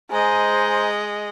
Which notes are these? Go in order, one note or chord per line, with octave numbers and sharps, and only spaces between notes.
G#3 C5 D#5 G#5 A#5